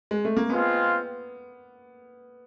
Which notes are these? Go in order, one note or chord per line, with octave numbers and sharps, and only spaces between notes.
G#3
A3
A#3
G#3 B3 C4 F4